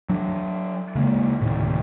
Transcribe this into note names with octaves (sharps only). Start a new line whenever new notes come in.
F#3 D4
C#3 G#3 A#3
D1 A2 C3 D#3